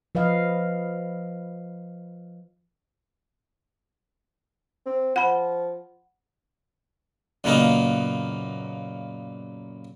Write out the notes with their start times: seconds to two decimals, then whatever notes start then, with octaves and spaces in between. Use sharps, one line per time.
0.15 F3 B4 D#5 F5
4.86 C4
5.16 F3 F#5 B5
7.44 F#2 A#2 C#3 A#3 B3 D#4